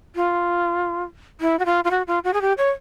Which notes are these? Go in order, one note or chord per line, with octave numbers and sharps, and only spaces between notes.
F4
E4
F#4
F4
F4
F#4
F4
F#4
G#4
G4
C#5